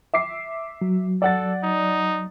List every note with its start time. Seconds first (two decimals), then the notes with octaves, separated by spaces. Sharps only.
0.13 E5 D6 C7
0.82 F#3
1.22 A4 D5 F#5 A6
1.63 D#4